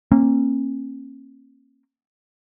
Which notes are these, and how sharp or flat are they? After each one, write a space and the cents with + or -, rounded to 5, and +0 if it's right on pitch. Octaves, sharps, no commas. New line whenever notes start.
A#3 +0 C#4 -40